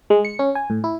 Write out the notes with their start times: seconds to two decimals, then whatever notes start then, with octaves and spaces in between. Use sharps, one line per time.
0.10 G#3
0.25 C#7
0.39 C#4
0.55 G#5
0.70 A2
0.84 E4